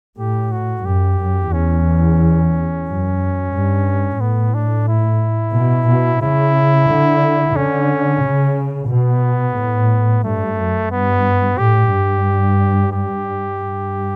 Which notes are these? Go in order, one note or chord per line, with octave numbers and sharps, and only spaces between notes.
A2 G4
F#4
F#2 G4
F#2
E2 C#4
F#2
G2
A2 B3
D4
E4
B2
B2
C#3 E4
D3
D3 C#4
C#3
B2 B3
A2
G2 A3
F#2
G2 B3
A2 G4
G2
G4
G2